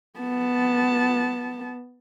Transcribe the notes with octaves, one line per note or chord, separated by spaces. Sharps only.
B3 A5